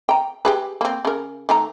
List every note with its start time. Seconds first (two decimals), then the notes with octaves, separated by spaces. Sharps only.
0.09 G5 A#5
0.45 G4 G#4 B4
0.81 A#3 C4
1.05 C#3 A#4
1.49 D#3 A3 A#5